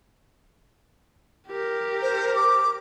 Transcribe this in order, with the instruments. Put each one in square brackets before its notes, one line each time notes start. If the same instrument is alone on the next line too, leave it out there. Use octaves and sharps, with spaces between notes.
[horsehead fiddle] G4 A#4
[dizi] C5
D6